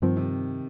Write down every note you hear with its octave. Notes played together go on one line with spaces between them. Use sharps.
G2 D#3 F3 C4
C3